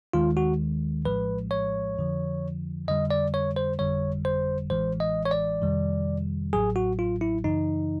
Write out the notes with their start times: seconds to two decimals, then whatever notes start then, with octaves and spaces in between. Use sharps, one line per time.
0.13 D#2 D#3 G#3 F4
0.37 F#4
1.05 A#1 A2 F3 G#3 B4
1.51 C#5
1.96 F2 D3 F3
2.88 F2 D3 G3 D#5
3.11 D5
3.34 C#5
3.56 C5
3.79 G1 F2 D3 G3 C#5
4.25 C5
4.70 A1 A2 E3 G#3 C5
5.00 D#5
5.26 C#5
5.31 D5
5.62 F2 C3 D#3 G3
6.53 A1 A2 F#3 G#4
6.76 F#4
6.99 F4
7.21 E4
7.44 F#2 C#3 E3 D#4